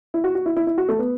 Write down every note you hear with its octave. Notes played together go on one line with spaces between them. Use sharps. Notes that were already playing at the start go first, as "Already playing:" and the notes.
E4
F#4
F#4
E4
E4
E4
F#4
A3
B3